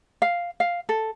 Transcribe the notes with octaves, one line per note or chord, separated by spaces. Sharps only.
F5
F5
A4